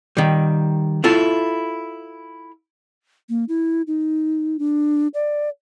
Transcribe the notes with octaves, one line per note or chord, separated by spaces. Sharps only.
D#3 G3
E4 F4 A4
A#3
E4
D#4
D4
D5